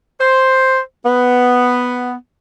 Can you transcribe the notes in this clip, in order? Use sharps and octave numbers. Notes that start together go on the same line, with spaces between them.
C5
B3